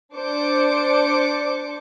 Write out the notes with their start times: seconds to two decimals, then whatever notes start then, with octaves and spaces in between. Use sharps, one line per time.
0.14 D4 C5 D6 C#7